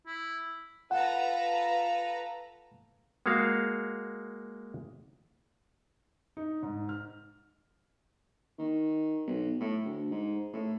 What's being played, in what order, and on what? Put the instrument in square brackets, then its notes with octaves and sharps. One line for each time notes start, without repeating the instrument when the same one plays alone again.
[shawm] E4
[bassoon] F4 [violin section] A4 B4 A#5 [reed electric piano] F#5
[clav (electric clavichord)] G#3 A#3 F#4 G#4 F5
[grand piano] D#4
G#2
F6
[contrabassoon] D#3
B1
A2
D2
G#2
A2